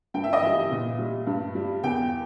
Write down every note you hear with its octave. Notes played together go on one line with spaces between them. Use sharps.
G2 G5
E5
D#5
E3 G3 E5
A#2
G3
G2
G3
E2 G5